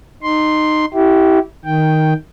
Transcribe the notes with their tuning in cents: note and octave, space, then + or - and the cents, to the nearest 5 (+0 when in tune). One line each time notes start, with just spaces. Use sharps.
D#4 -15 C6 +0
E4 -15 G4 -25
D#3 +0 G5 +0